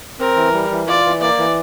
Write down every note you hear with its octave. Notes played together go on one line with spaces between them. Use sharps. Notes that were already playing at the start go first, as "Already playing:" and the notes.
C4 A#4
E3
G3
E3
F4 D5
E3
A#3 D5
E3